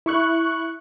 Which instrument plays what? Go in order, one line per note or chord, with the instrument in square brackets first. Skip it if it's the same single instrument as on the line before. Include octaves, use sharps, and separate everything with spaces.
[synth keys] E4 C#6 F#6